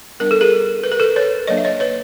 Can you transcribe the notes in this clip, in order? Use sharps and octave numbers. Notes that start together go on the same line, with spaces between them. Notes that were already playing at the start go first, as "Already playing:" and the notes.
G3 B3 D4 A#4
A4
G#4 A#4
B4
A#4
A4 B4
B4 C#5
F#3 A#3 D4 C#5 D#5
E5
C#5 D#5
B4 C#5